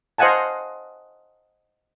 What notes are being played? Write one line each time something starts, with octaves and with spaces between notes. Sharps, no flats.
C5 D#5 F5 F#5 G#5 A5